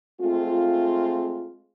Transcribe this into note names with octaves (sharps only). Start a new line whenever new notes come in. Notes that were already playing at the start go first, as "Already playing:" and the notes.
G#3 A3 C4 F4